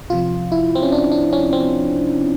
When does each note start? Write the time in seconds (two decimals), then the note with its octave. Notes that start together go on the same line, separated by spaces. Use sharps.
0.10 C2 C3 F3 F4
0.52 E4
0.75 C4
0.83 C#4
0.92 D4
1.12 D4
1.33 C#4
1.53 C4